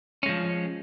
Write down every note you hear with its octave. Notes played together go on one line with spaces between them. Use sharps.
F3 G#3 C#4